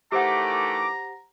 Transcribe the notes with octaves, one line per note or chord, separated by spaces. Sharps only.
D#3 E3 A3 G4 C5 F#5 A#5 D6